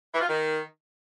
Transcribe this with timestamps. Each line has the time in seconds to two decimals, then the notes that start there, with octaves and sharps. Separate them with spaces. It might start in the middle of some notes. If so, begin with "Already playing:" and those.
0.13 E3
0.20 F4
0.28 D#3